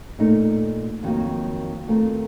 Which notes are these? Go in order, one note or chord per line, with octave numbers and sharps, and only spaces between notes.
A#2 A3 D#4
F2 D#3 F#3 A#3
D#3 A3 C4 F4 A#4